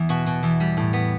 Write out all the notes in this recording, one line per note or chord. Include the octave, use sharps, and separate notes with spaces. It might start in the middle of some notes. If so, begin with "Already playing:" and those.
Already playing: E2
B2 F#4
B2
E2
G3
A2
B3